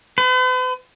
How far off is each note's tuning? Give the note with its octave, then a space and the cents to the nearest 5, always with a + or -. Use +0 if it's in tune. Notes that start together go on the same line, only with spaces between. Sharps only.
B4 +45